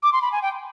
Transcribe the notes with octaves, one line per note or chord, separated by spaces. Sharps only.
D6
C6
B5
G#5
G5